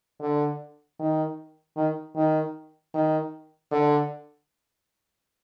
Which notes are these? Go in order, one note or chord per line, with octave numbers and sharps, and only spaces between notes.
D3
D#3
D#3
D#3
D#3
D3